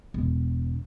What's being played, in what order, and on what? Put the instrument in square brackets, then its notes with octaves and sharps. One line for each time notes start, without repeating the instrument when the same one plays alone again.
[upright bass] E1